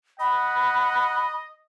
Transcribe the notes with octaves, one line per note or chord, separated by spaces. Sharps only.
D#5 F#5 B5